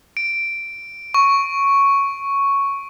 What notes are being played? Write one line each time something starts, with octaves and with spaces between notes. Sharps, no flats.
D7
C#6